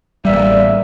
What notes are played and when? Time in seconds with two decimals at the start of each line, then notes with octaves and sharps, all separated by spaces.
0.25 A1 G3 A#3 D5 E5